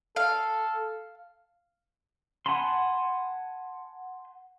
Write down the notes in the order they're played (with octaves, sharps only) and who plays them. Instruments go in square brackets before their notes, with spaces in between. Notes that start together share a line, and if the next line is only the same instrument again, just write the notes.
[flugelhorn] A4 [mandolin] F5
[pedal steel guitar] F#5 G#5 A5 B5 C6